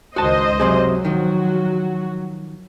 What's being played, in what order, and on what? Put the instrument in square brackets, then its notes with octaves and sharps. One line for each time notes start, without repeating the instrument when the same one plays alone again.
[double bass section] C#2 D#3 [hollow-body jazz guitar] F#4 A5 [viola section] C5 D#5
[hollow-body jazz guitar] F#2 C3 G#4 [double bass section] F#3
[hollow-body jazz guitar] D#3 F3 [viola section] F#4